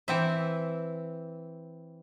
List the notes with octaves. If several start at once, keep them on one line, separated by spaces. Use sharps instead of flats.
E3 C4 E5